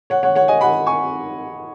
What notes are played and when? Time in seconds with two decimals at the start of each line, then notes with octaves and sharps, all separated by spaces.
0.10 C#5 F#5
0.23 C#5 F#5
0.35 C#5 F#5
0.48 D#5 G#5
0.61 F#5 B5
0.86 G#5 C#6